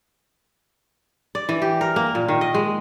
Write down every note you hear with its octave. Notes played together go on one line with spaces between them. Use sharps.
D5
E3
G4
A#4
A#3
A#2
D#3
D#5
G#3